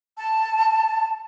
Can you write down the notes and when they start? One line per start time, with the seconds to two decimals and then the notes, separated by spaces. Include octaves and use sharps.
0.18 A5